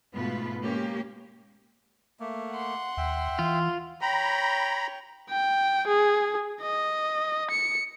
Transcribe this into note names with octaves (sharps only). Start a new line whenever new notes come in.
G#2 B2 A3 B3 F4 B4
G#3 A#3 C#4 G4
A3 A#3
F#5 C6
D#2 E5 G5
E3 F4
C#5 G5 A#5 B5
G5
G#4
D#5
C#7